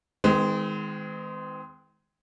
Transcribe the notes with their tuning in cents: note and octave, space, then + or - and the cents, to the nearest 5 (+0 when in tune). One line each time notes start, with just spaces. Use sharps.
D#3 +25 G#3 +0 C4 -40